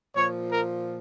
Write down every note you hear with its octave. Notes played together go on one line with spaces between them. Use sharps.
A#2 F3 C#5
A#4